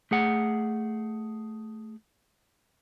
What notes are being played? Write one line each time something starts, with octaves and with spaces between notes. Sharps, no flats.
A3 G#4 F#5